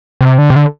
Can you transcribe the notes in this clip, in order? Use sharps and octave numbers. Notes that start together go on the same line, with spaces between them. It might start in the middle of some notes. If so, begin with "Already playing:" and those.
C3
D3
C3
D3